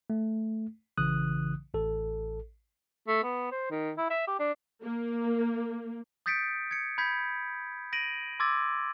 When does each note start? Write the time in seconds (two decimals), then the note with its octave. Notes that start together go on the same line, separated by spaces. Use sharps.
0.10 A3
0.98 A#1 C#3 E3 D#6 F#6
1.74 A1 A4
3.08 A3
3.24 B3
3.51 C5
3.70 D#3
3.97 E4
4.10 E5
4.27 G4
4.40 D4
4.82 A#3
6.26 D#6 G6 A6 B6 C#7 D7
6.71 G#6 C#7
6.98 B5 G6 G#6 B6
7.93 A#6 D7 D#7 F#7
8.40 C6 D6 E6 G#6 A6